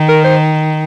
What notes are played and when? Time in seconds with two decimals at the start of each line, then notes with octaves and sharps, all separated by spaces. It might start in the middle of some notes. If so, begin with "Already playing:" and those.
Already playing: D#3
0.09 A#4
0.24 C5